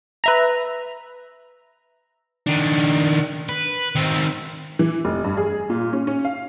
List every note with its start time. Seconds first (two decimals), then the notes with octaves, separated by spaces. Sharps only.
0.24 B4 E5 A#5
2.47 D#3 D4
3.49 B4
3.95 D#3 C4
4.79 E3
5.05 F1
5.24 G2
5.37 G#4
5.70 A#2
5.93 C#4
6.07 C#4
6.25 F5